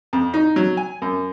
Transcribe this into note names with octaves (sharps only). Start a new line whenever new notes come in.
F2
D#4
F#3
G#5
F#2